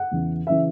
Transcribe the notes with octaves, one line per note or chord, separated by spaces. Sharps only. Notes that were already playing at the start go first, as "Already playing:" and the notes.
Already playing: F#5
E2 C#3 E3
C#3 E3 E5